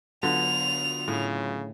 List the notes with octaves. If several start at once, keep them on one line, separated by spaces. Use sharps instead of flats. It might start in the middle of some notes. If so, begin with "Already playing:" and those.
D3 F#3 B3 F4 F7
A2 C#3